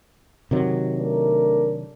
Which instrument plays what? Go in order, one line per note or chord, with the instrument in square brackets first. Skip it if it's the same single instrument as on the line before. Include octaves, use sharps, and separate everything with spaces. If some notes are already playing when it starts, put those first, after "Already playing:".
[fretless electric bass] C3 D#3 F#3
[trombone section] A3 D4 A#4